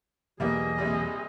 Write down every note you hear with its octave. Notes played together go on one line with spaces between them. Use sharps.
B1 E2 G3 A#3 B3 G#4 D#5
A#1 C3 G3